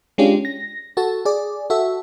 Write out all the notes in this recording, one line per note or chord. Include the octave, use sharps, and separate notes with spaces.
G#3 C#4 D4 F4 G4
A#6
F#4 A4 A5
G#4 D5
F#4 A4 E5